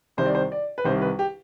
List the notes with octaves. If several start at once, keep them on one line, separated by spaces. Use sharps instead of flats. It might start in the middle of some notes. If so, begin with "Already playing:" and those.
C2 C3 D#3 C5
D5
C5
D5
B4
C2 C3 D#3 C5
B4
G4